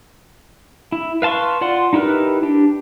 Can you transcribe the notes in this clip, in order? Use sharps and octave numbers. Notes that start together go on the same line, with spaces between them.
E4
B4 F5 A5 C6 C#6
F4 D5 F#5 C6
D#4 E4 G4 A#4 B4
D4 G4